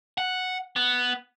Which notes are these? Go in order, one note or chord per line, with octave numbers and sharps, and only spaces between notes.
F#5
B3